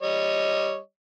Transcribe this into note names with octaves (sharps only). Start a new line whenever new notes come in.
G3 C#5 D#5